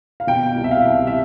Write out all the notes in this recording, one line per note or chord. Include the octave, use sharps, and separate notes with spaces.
F5
B2 G5
C2
E5
F5
C2
E5